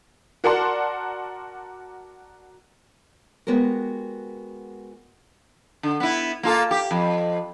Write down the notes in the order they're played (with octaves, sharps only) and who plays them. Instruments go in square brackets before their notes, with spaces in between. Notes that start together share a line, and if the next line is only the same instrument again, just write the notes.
[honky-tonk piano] F#4 A#4 D5 F#5 A5 C6
[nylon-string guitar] G#3 B3 F#4 G4 A#4
[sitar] D3
B3 E4
A#3 F4 A4
G4
F2